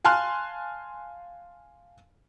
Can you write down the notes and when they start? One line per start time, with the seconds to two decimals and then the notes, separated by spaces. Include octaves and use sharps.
0.05 F5 G#5 A5 C6 F6 F#6